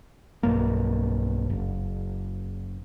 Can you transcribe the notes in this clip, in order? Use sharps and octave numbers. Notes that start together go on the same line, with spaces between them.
B1 G2 A#3
F#1